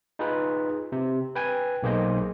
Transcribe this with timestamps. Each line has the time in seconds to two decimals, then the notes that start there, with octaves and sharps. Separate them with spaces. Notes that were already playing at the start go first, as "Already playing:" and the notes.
0.19 D#4 F4 G#4 B4
0.92 C3
1.36 B4 G5 G#5
1.83 B1 A#3 G#4 C5 D#5